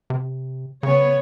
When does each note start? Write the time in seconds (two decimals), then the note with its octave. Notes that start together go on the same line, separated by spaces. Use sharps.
0.10 C3
0.83 C#3 B3 C#5